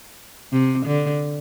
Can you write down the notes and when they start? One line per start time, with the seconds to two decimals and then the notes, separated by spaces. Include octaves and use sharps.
0.53 C3
0.87 D3